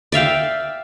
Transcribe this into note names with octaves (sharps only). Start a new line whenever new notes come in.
D5 E5 F5 G5